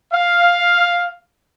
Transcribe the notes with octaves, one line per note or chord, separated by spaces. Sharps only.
F5